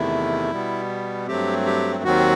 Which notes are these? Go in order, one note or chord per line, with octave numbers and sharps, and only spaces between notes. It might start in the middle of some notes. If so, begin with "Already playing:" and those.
Already playing: E2 C3 D#3 A3 E4
B2 G3 B3
G2 F#3 A3 C4 G4
G4
D#2 D#3 F#3 C4 F#4